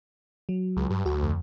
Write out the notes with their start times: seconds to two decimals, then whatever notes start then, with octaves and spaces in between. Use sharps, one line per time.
0.49 F#3
0.77 C#2
0.90 G2
1.06 D2 F#4
1.23 F2